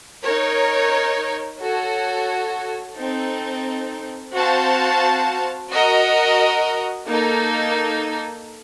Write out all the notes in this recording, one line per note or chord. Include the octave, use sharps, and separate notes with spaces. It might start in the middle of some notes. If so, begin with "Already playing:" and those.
D#4 A#4 C#5
F#4 A4 C#5
C4 D#4 A4
C4 F#4 C5 F5 A5
F#4 A#4 D#5
A#3 D#4 A4